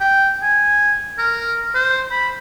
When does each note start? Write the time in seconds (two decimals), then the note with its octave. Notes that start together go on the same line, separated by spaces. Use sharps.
0.01 G5
0.43 G#5
1.18 A#4
1.75 C5
2.11 B5